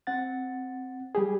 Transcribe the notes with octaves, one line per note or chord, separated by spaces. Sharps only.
C4 F#5 A6
G3 G4 G#4